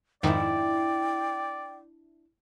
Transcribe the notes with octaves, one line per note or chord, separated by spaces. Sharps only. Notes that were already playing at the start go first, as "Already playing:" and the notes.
F2 G#2 D#3 D4 E4 D5 G5